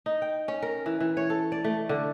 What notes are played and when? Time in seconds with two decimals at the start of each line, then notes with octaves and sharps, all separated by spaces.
0.06 D#4
0.22 G5
0.48 C#4
0.62 A#4
0.86 E3
1.00 E3
1.17 C#5
1.30 A4
1.52 D5
1.64 A3
1.89 D3